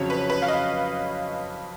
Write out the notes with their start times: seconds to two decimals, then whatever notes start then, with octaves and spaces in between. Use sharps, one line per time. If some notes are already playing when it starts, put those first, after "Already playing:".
Already playing: F2 C#3 F#3 C#4 C#5
0.10 B4
0.29 B4
0.42 F5
0.48 D#5